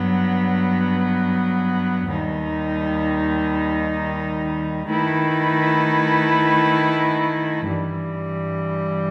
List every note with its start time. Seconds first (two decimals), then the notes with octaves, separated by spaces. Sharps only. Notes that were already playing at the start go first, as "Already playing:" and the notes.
Already playing: G2 F#3 B3
2.07 D#2 D#3 G3 D#4
4.87 D#3 A3 E4 B4
7.66 G2 E3 G3